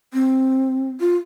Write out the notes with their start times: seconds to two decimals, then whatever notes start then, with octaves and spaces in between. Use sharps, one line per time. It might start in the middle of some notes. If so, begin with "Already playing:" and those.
0.14 C4
1.00 F4